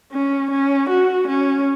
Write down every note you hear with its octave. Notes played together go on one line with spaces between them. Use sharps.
C#4
C#4
F#4
C#4